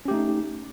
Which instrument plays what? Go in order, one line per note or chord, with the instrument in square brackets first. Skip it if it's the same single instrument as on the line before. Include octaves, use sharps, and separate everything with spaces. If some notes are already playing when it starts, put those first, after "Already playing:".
[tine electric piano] C#4
G4
A3
D#4